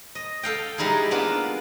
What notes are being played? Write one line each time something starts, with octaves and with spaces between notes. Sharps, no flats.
D#5
A4 F5 G5
G3 G#3 D#4 E4 G#4
A#3 B3 D4 F4